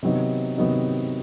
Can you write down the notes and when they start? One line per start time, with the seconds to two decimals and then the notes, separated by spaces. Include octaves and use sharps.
0.03 C3 D#3 F#3 B3 D#4
0.58 C3 D#3 F#3 B3 D#4